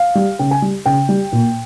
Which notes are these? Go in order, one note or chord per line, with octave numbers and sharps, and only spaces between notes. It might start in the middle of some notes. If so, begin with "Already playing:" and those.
Already playing: F5
G3
C#3 G5
G#5
G3
C#3 G5
G3
A#2